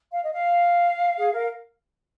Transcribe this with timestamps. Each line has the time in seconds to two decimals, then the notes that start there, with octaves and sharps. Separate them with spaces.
0.11 F5
0.22 D#5
0.32 F5
1.18 G#4
1.32 A#4